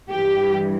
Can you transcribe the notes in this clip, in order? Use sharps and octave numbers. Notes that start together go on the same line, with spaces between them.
G2 E3 G4